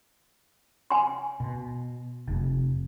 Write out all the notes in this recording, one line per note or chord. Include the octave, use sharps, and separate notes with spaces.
G#5 C6
B2
F1